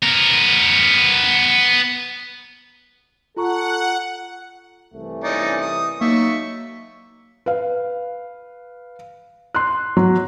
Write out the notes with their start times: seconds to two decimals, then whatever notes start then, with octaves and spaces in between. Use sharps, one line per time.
0.03 B3 A#4
3.37 F4 A4 F#5 A#5 C#6
4.95 C2 E3 A3
5.24 C#4 D#4 D5
5.61 D#6
6.01 F#3 A#3 D#4 E5 C#6
7.46 B4 F5
9.55 C6 F#6
9.97 F#3